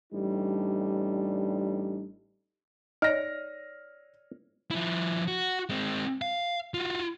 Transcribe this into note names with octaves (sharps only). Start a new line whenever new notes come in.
A1 G3 D4 D#4
D#4 C#5 D5 F6 A#6
F3 E4
F#4
G#3 C4
F5
F4 F#4